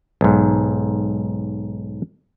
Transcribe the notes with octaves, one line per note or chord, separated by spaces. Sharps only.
B1 G#2